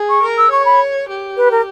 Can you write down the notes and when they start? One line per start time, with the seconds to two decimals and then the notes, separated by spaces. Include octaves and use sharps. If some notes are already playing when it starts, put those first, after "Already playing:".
Already playing: G#4
0.09 C#6
0.22 A#4
0.38 E6
0.51 C#5 C#6
0.65 B5
1.09 G4
1.36 B4
1.51 A#4